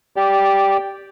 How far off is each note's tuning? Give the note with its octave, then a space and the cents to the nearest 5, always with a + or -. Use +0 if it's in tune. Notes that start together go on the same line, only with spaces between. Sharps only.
G4 +0 D5 -10